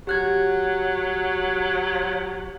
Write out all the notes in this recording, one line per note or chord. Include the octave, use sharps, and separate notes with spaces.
F#3 G4 F#6 G#6